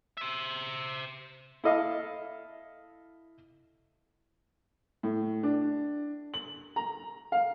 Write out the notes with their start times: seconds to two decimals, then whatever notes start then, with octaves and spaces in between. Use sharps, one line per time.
0.17 C5 E5
1.64 E4 A4 D#5 F5
5.03 A2
5.43 D4
6.34 F#7
6.76 A#5
7.32 F5